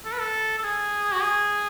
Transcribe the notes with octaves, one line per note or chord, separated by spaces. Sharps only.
A4
B4
A4
A4
G#4
F#4
G#4